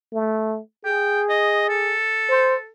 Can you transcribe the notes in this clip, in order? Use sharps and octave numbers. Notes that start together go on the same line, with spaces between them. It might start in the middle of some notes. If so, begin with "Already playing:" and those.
A3
G#4 G5
D#5
A4
C5